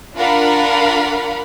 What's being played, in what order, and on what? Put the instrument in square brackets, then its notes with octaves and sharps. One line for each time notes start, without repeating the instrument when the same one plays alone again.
[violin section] D4 F4 A#4 F5 F#5 B5